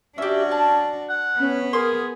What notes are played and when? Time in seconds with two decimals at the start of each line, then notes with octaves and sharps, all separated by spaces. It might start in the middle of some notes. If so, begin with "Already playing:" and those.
0.18 C#4 D4 F#4 G4 E5
0.51 A5
1.09 F#5
1.40 B3 C#4
1.73 G#4 A#4 C6 D#6